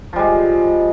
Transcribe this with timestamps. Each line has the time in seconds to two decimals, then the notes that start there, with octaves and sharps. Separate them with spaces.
0.13 F3
0.16 G3
0.19 G#3